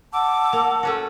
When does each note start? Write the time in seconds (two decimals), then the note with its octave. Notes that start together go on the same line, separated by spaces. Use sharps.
0.13 F#5 A5 D6 E6
0.53 A#3
0.83 A3 C#4 F#4